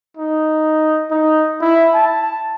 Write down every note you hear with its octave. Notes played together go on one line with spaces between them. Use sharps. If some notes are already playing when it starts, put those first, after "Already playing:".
D#4
D#4
E4
A5